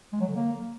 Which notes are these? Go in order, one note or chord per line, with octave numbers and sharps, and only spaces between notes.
G#3
F#3
D3
A#3